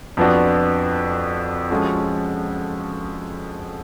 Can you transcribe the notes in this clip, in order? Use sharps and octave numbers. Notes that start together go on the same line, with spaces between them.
F2 F3 B3 D4 F#4
F3 G#3 C#4 F#4 A4